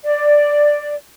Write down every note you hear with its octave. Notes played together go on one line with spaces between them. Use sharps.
D5